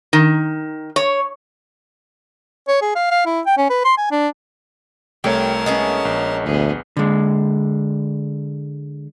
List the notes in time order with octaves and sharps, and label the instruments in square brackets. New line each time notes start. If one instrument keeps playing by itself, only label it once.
[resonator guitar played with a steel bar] D#3
C#5
[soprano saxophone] C#5
G#4
F5
F5
E4
G5
C#4
B4
C6
G#5
D4
[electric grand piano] C2 A3 C#5 [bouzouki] G4 [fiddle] A#4 A5
[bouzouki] G#3 B3 C#4
[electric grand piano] A#1
[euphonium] D2 [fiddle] B3 G#4
[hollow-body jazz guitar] D3 G#3